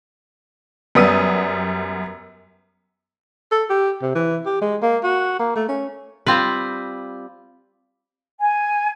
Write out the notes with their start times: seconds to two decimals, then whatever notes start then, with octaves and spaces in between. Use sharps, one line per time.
0.95 F#2 G3 B3 D#6 D#7
3.51 A4
3.70 G4
4.02 C3
4.15 E3
4.46 G4
4.61 G#3
4.82 A#3
5.04 F#4
5.39 A#3
5.56 A3
5.68 C#4
6.26 G3 C4 F4 B4
8.40 G#5